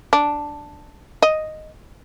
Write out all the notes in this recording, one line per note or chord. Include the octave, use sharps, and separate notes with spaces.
D4
D#5